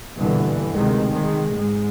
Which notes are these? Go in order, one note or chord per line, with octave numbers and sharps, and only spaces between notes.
A#1 G2 B2 D3 E3
D2 C3 D#3 G#3
D#3 G#3
G#2 G#3